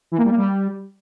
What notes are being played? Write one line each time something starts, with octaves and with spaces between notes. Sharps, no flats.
E3
A#3
G3
A#3
G3